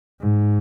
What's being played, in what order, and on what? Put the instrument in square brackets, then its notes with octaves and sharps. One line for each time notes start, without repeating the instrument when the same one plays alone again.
[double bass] G#2